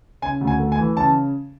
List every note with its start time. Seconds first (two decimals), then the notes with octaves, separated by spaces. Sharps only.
0.22 C#3 G#5
0.41 D2
0.47 G#5
0.60 A3
0.72 G#5
0.78 E3
0.97 C#3 A5